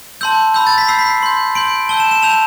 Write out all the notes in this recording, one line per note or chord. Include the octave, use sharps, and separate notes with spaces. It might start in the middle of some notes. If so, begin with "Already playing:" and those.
A5 C6 E6 G6
B5 E6 G6
A6
B6
B5 E6 G6 C7
B6
C7
C6 G6
C6 G6 D7
A5 E6 G6 G7
E7
E7
A5 E6 G6 F7